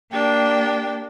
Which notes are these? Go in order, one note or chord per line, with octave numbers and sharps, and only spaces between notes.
A#3 D4 G4 G5